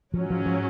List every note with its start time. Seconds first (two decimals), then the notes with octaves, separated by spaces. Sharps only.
0.14 G#2 F3 F#3 C#4
0.30 F3
0.46 F3